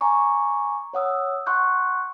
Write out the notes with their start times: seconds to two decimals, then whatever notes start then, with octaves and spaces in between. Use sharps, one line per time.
0.01 G#5 A#5 C#6 D6
0.93 C#5 F#5 D#6 E6
1.46 F#5 C6 C#6 F#6 G6